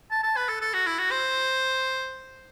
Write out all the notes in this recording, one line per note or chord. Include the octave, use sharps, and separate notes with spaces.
A5
A5
B4
A4
A4
F#4
E4
F#4
C5